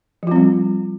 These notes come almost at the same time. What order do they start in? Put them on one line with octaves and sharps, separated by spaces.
F3 F4 C4 G3